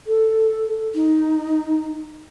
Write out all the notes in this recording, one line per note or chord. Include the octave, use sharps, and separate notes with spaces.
A4
D#4